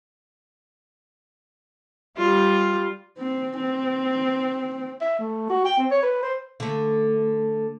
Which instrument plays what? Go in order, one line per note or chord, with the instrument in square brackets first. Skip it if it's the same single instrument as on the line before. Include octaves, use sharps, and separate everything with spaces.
[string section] G3 [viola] F4
[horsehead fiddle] C4
C4
[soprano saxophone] E5
A3
F#4
G5
C4
C#5
B4
C5
[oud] D3 A3